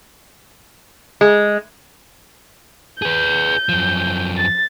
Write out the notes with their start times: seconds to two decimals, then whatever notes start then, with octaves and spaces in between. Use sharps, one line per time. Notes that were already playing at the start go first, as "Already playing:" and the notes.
1.21 G#3
3.02 G#4 B4 G6
3.69 F#2 F3
4.38 A6